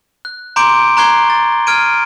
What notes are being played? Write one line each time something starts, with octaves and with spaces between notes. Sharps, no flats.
F#6
A#5 C6 D6 G6 D7
A#5 C#6 F#6 G#6 C7 G7
A6
F6 G#6 D7 D#7